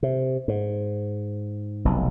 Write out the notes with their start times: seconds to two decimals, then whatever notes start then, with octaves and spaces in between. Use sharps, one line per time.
0.03 C3
0.48 G#2
1.85 F1 B1